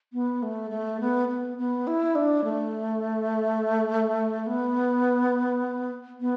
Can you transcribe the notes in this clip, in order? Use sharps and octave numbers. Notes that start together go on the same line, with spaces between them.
B3
A3
A3
B3
B3
B3
E4
D4
A3
B3
B3